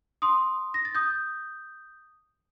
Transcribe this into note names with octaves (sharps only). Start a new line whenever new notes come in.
C6 D#6
A#6
A6
D#6 G6